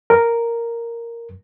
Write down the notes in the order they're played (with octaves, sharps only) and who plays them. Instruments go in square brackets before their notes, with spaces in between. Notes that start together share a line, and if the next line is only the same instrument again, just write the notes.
[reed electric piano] A#4